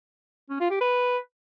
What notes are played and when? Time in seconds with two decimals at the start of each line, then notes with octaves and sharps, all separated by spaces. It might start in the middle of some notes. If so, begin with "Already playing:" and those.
0.50 C#4
0.60 F4
0.70 G4
0.81 B4